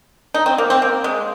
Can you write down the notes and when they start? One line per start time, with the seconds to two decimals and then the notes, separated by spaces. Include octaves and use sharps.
0.34 D#4
0.46 C4
0.58 A#3
0.70 C4
0.82 A#3
1.04 G#3